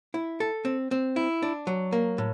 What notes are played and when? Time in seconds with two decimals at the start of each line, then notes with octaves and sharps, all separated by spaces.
0.14 E4
0.40 A4
0.65 C4
0.91 C4
1.16 E4
1.42 D4
1.67 F#3
1.92 A#3
2.18 A2